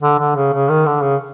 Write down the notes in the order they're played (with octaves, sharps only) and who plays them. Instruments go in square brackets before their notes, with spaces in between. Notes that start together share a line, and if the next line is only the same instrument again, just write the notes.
[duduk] D3
D3
C#3
C#3
D#3
D3
C#3